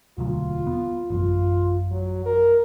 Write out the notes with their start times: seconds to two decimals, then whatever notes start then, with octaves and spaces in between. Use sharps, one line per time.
0.18 E1 D2 F#3 F4
0.67 B3
1.10 A1 F#2 F4
1.91 F#3
2.26 A#4